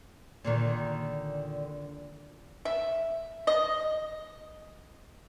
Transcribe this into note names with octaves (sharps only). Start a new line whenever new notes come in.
A#2 D3 D#3
E5
D#5